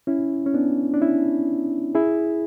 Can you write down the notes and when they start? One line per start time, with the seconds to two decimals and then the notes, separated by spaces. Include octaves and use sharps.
0.07 C#4 E4
0.46 C#4
0.54 B3 D4
0.94 D4
1.01 C#4 E4
1.95 E4 G#4